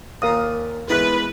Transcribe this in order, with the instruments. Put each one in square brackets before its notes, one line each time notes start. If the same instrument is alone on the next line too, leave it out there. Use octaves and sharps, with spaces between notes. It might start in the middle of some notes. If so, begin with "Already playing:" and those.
[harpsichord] D#2 A#2 [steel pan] A#4 F5 D#6
[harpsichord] E2 G#3 B3 [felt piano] E4 B6 [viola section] B4